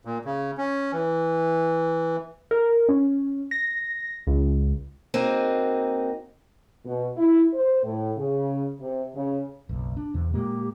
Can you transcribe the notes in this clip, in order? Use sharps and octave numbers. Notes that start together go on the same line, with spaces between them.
A#2
C#3
C#4
E3
A#4
C#4
A#6
C#2
A#3 C4 D#4 F#4 G#4
B2
E4
C5
A2
C#3
C3
C#3
F#1 B1
D4
E2 C3
A#2 G#3 A#3 G4